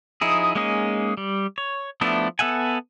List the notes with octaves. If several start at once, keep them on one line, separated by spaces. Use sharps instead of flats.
F3 D#4 E4 G#4
G#3 A#3 C#4 D#4 G#4
G3
C#5
F3 A3 B3 D4 E4
B3 A4 E5 F#5 G#5